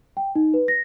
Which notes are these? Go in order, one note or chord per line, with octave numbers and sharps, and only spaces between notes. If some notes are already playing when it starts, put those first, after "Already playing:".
G5
D#4
B4
A#6